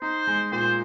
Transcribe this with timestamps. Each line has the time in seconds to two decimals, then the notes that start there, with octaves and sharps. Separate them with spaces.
0.02 D#4 C5
0.27 G#3
0.52 A#2 C5